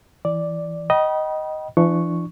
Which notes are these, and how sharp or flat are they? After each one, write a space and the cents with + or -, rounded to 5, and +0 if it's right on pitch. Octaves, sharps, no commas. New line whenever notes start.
E3 +0 D5 +0
D#5 +0 G5 -35 B5 -35
E3 +45 D4 +20 C#6 +0